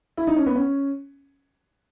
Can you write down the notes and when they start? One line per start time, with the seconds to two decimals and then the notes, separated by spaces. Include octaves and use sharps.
0.17 E4
0.27 D#4
0.36 C#4
0.46 B3
0.56 C#4